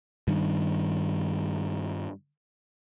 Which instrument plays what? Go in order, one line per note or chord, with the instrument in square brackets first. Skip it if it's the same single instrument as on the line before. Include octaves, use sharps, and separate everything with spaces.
[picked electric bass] G2 D#3